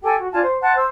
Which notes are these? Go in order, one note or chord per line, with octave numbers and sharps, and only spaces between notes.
G4 A4 G5 G#5
F#4
D4 F4 G#5 A5
C5
F#5 A5 C6 F#6
C5 E6